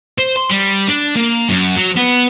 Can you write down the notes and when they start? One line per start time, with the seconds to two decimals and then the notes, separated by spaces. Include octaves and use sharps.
0.18 C5
0.36 C6
0.50 G3
0.88 D4
1.16 A#3
1.49 F#2
1.76 F#3
1.96 B3